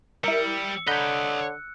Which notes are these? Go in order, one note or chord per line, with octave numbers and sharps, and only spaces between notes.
G3 E4 A#4 E6 C#7
D3 C#5 D#5 A#5 B5 F#6 G6